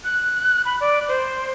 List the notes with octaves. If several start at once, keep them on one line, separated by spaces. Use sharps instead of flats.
F#6
B5
D5
C5